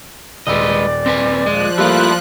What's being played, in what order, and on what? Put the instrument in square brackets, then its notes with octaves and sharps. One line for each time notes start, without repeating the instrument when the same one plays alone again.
[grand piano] D#1 E6 [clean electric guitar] G#3 B4 D#5 [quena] D5
[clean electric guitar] C4 B4 G#5
[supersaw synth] F3 F#6 [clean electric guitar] G#3
[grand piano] G3 A3 A#3 [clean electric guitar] E4 F4